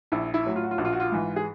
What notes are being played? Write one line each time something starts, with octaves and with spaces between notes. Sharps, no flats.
A#1 E4
E4
A2 F#3
F4
F#4
F4
A#1 F#4
F4
F#4
F4
G#2 E3
G#4